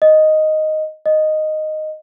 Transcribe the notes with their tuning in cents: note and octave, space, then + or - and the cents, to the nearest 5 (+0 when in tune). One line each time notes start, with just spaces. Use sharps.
D#5 +0
D#5 -5